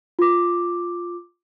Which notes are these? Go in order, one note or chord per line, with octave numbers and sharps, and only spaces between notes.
F4 D6